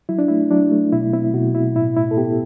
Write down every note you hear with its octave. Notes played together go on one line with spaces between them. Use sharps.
F#3 E4
D4
A3 E4
F#3 D4
A3
B2 E4
C4 E4
B2 F#4
B2 E4
A2 E4
A2 E4
A4
B3 G4